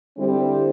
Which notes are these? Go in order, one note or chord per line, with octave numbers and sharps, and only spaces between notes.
D3 G3 C4 E4 G4